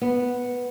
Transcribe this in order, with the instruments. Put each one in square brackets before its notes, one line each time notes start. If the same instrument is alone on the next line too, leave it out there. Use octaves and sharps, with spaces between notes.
[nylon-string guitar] B3